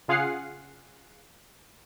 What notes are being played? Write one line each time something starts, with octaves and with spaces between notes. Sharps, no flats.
C#3 F4 G#4 F5 F#5 C7